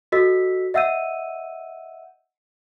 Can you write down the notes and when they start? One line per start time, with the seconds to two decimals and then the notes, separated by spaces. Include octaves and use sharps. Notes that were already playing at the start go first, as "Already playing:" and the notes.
0.12 F#4 A4 D#5 E6 B6
0.74 D#5 E5 F#5 E6 G6 D#7